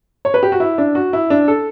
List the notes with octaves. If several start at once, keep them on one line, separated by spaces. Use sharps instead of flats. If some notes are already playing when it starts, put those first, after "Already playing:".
C#5
B4
G4
F#4
E4
D4
F#4
E4
D4
A4